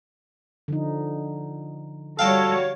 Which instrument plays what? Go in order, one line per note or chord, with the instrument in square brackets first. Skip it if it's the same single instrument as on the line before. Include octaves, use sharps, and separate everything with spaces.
[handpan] D3 F3 D#4
[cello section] G3 F#4 C#5 [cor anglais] A4 [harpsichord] F5 G5 A5